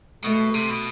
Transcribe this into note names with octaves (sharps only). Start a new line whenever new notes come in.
B2 A3
C3
B2